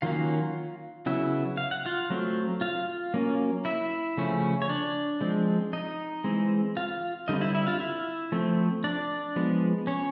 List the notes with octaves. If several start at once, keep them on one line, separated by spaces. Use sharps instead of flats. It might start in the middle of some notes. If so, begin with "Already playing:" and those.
D#3 F#3 A#3 C#4 F4 F5
C#3 F#3 B3 E4 E5
F5
F#5
F4 F5
F#3 A3 C4
F4 F5
F#3 A#3 C#4
E4 E5
C#3 F3 A3 C#4
C#5
D4 D5
F3 G#3 C4
D#4 D#5
E3 G#3 C4
F4 F5
D3 G3 C4 D#4 D#5
E4 E5
E4 E5
F4 F5
E4 E5
F3 A3 C4
D4 D5
F3 G#3 B3
C#4 C#5